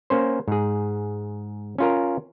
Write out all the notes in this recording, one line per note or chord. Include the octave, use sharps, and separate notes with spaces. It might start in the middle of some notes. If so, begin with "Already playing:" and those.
A#3 C#4 C5
G#2 G#4
C#4 F4 A#4